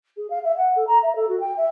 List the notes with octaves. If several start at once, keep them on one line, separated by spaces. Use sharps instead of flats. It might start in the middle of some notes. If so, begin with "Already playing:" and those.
G#4
F5
E5
F#5
A4
A#5
E5
A4
F#4
G5
E5